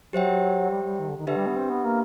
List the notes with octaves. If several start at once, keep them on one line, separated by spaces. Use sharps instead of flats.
F#3 G4 C5 E5 G5
G3
G3
D#3
D3
D#3
D3 D4 G4 B4 E5
G3
B3
C4
B3
A#3